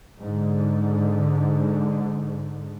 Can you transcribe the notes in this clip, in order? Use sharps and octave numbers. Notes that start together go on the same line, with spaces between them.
G#2 D3